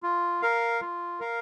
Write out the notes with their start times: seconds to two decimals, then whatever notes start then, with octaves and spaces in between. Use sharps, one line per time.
0.03 F4
0.42 A#4 F5
0.81 F4
1.20 A#4 F5